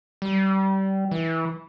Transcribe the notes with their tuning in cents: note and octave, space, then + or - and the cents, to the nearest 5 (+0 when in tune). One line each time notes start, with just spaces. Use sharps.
G3 -25
E3 -15